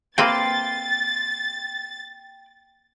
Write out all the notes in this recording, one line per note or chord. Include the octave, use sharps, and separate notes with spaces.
A#3 C4 B4 G5 C6 A6